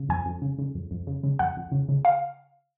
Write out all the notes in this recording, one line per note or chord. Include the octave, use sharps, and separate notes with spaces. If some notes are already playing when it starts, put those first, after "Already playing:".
Already playing: C#3
F2 G#5
F2
C#3
C#3
F2
F2
C#3
C#3
F2 F#5
F2
C#3
C#3
F5